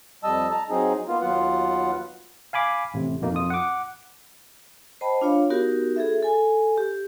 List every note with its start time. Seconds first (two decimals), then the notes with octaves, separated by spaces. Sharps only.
0.24 F2 G3 D#5 A5 E6
0.51 A5 A#5
0.70 F#3 C4 D#4 G#4
1.08 A#3 B3 F4
1.21 D#2 F#3 B3 F4 F#5
2.53 F5 G#5 B5 D6
2.94 A1 C3
3.21 F2 B2 A#3 D#4
3.33 F2 F4 D#6
3.50 F#5 D6
5.01 C5 D#5 G5 A5 B5
5.21 D4 F4 C#5 F5
5.50 B3 D#4 F#4 G4 A#4
5.96 G#4 A4 E5
6.22 A4 G#5
6.77 G4